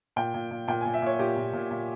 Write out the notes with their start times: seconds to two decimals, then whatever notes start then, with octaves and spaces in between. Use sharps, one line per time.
0.16 A#2 G5
0.34 A#2
0.51 A#2
0.68 A#2 G5
0.81 A#2 G#5
0.94 E5
1.02 A#2 C#5
1.19 A#2 G4
1.36 A#2
1.53 A#2
1.71 A#2